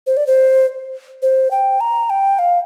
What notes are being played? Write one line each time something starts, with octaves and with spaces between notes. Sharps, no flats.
C5
D5
C5
C5
G5
A#5
G5
F5